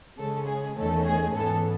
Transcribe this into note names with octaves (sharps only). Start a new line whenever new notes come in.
C#3 G#3 C#4 A4
G#4
E2 D#3 A3 C#4 A4
G#4
G#2 E3 B3 A4